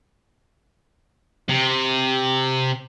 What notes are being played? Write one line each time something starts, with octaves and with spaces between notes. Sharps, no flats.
C3